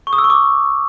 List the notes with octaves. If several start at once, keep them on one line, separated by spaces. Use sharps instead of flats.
C#6
D#6
E6
C#6
D6